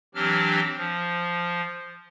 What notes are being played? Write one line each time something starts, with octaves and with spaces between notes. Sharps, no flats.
E3 F#3 C4 D4 G4 F6
F3